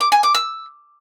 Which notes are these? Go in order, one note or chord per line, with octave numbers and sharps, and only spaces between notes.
D6
G#5
D6
E6